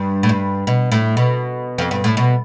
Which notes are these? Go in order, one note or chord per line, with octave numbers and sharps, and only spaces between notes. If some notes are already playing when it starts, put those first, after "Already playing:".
Already playing: G2
A2
G2
B2
A2
B2
F2
G2
A2
B2